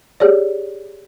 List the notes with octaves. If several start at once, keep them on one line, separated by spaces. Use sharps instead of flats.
G4 G#4 C#5 D5